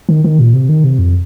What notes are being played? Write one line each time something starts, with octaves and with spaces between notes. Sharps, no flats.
D#3
D#3
A#2
C3
D#3
C3
F2